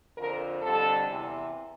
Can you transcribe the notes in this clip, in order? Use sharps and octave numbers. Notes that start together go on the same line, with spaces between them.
F2 D3 F3 A#4
F2 D3 G3 A4
E2 C3 E3